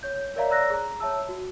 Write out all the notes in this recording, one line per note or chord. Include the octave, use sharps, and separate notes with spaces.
C#5 G6
A#4 C#5 D5 E5 F5 A#5
C#5 D5 A#5 E6 F#6 A#6
G#4 A#5
C#5 E5 A5 E6
F#4